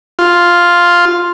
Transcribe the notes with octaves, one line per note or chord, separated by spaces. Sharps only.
F4